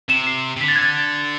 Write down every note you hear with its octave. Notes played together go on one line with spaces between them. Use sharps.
C3 E7
C7
C3
D3 B6
A6
G#6
A6